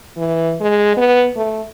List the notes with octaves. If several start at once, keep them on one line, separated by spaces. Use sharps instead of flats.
E3
G#3
B3
A3